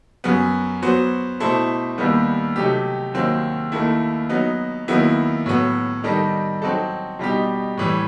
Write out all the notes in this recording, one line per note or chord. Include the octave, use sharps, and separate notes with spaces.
F#2 F#3 B3
F#3 B3 F#4 C5
B2 A3 E4 A4 C5
D#2 D#3 G3 B3
C3 F#3 A3 D#4 G4
D#2 D#3 F#3 C4 F#4
D#2 D#3 A3 E4
F#3 B3 D#4
D#2 D#3 F#3 B3 E4
A2 F#3 B3
D#3 G3 D#4 A4
F#3 C4 D#4 F#4 A4
B2 G3 D#4 G4
A2 E3 G3